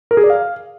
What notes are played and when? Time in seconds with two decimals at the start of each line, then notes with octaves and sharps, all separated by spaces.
0.11 A#4
0.17 G#4
0.23 D5
0.30 F5